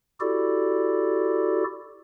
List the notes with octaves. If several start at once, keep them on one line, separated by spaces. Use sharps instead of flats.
E4 F#4 G4 A4 D5